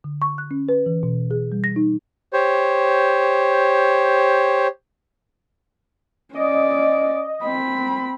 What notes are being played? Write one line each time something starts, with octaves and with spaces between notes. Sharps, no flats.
D3
C#6
F#6
C#4
B4
E3
B2
G#4
G3
A#6
D#4
G4 C5 C#5
C#4 D5 D#5
C4 B5